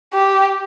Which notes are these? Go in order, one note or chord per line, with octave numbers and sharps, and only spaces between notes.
G4